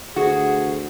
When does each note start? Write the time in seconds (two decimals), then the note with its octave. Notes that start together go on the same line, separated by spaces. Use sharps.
0.16 D2 F#4 G#4